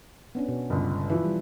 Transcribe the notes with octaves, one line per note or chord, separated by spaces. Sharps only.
B3 C#4 D4
B2
G1 C#2
E3 F3 B4 E5
G3